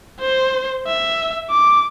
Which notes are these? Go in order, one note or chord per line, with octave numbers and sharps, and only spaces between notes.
C5
E5
D6